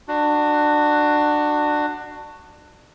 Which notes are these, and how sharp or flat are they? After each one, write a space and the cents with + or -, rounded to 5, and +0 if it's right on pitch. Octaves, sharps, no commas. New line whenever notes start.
D4 +20 F#4 +0